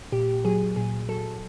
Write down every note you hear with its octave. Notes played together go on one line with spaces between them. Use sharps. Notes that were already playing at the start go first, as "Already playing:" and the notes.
A#2 G4
F#3 G#4
A#2 G#4
F#3 A4